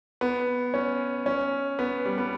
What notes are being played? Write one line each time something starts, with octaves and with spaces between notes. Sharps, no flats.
B3
C#4
C#4
B3
G3
B3